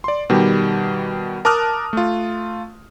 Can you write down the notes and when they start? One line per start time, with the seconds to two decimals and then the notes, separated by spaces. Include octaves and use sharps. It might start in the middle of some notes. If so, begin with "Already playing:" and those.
0.04 D5 C6
0.30 B2 D#3 G3 G4
1.45 A#4 A5 D6 D#6 F6 F#6
1.93 A3 F4